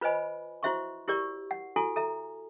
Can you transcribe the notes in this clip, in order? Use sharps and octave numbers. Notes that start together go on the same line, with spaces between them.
F4 B4 C5 D#5 G#5 B5
E4 F#4 C5 E5 C6 C#6
E4 G4 A#4 D5 C#6
F#5
E4 F#4 A4 G#5
A4 E5 A#5